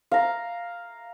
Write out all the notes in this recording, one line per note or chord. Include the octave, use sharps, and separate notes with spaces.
F5 A#5